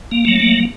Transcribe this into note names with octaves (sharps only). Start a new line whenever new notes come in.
A#3
F#3 A3
A#3